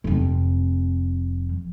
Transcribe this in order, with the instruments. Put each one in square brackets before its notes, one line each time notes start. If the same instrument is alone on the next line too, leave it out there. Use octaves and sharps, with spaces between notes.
[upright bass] F1 F2